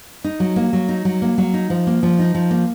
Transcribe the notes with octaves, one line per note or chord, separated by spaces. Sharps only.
D#4
F#3
A#3
F#3
D#4
F#3
A#3
F#3
D#4
F3
A#3
F3
D#4
F3
A#3